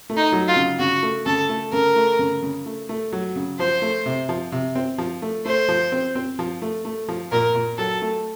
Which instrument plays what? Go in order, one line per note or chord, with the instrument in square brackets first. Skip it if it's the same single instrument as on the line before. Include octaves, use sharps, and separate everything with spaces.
[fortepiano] A3
[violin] D#4
[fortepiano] F#3
[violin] F4
[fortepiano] C#3
[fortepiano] C#3 [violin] F#4
[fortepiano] A3
[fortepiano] C#3 [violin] A4
[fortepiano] A3
[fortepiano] C#3 [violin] A#4
[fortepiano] A3
C#3
C#3
A3
A3
F#3
C#3
[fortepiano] F3 [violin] C5
[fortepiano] A3
C3
F3
C3
C4
F3
A3
[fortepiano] A3 [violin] C5
[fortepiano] F3
C4
C4
F3
A3
A3
F3
[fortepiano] A#2 [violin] A#4
[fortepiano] A#2
[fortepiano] F#3 [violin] A4
[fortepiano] A3